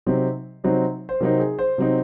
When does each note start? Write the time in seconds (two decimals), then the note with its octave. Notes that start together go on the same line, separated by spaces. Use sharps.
0.06 C3 F#3 C4 D#4
0.64 C3 F#3 C4 D#4
1.09 C5
1.20 C3 F#3 C4 D#4 A#4
1.40 G#4
1.59 C5
1.78 C3 F#3 C4 D#4